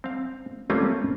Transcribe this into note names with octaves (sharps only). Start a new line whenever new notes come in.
C4 F5
G3 A3 A#3 C4 C#4 F4